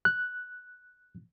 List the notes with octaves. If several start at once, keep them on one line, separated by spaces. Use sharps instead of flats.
F#6